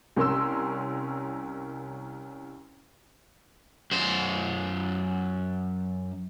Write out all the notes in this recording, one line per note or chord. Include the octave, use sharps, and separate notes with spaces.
C2 C#4 A#4 C6 E6
F#2 C5